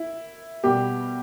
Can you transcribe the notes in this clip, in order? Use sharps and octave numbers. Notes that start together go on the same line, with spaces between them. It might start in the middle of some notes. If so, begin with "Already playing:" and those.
Already playing: E4
B2 G3 G4